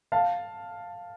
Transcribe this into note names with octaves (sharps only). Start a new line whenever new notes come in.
F5 A5